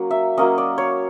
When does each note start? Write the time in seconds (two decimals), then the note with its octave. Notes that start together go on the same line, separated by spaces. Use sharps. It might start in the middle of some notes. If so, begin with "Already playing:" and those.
Already playing: F#3 A#3 C#4
0.11 E5
0.38 F#3 A#3 C#4 D#5
0.58 D5
0.78 C#5